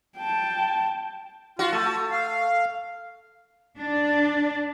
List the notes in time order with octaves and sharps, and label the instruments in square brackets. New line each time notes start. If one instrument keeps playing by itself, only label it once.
[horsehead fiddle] G5 A5
[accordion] F4 [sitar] F#4
[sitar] A3 [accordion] A5
[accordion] F5
[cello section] D4